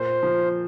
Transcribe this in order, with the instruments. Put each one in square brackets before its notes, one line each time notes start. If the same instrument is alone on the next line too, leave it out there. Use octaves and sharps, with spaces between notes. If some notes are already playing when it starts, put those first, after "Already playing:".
Already playing: [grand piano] A#2 [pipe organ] C5
[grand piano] F3